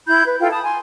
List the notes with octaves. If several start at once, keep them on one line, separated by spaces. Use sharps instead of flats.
E4 B5 G6
B4
E4 F4 A4 G5
A5 B5 D#6
G#5 C6